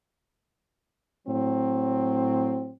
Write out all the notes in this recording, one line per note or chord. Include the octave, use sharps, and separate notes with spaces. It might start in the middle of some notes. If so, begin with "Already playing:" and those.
A2 F#3 C4